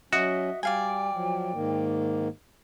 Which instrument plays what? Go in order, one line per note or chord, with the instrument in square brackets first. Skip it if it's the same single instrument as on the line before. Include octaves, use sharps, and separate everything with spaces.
[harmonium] F#3 C#4 [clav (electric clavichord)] F#4 [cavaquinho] D#5 [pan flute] E5
[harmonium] G3 [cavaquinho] D5 F5 G#5 [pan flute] G5
[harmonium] F3 F#3
G#2 D#3 A#3